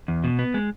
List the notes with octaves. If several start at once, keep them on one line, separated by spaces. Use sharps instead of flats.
E2
B2
B3
G#3